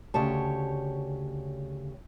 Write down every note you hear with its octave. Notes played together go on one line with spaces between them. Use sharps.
D2 C#3 G4 C#5 A5